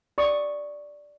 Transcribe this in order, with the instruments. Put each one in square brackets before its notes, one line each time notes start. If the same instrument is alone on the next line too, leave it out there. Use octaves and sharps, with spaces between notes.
[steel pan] D5 C#6 D#6